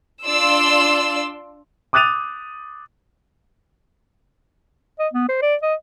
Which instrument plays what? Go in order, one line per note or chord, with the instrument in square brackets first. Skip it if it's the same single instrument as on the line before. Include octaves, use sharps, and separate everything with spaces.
[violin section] D4 F4 D5 C6 E6
[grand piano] D6 D#6 F#6 A6 D#7 F7
[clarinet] D#5
B3
C5
D5
D#5